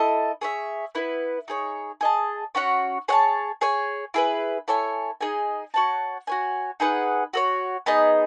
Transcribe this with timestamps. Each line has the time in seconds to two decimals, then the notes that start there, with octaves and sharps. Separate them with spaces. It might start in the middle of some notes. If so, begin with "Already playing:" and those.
Already playing: E4 A4 D#5
0.41 G#4 C#5 E5
0.95 B3 E4 B4
1.48 D#4 G#4 C#5
2.01 G#4 D#5 A5
2.55 C#4 F#4 C#5 F#5
3.08 G#4 C#5 F#5 A5
3.61 G#4 C#5 G#5
4.14 E4 G#4 B4
4.68 E4 A4 C#5 G#5
5.21 D#4 G#4 D#5 G#5
5.74 F#4 C#5 F#5 A5
6.27 F#4 C#5 G#5
6.80 D#4 G#4 B4 F#5
7.33 F#4 A4 C#5
7.86 B3 D#4 G#4 D#5